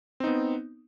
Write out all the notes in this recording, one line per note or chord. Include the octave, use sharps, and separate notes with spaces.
B3 C4 D#4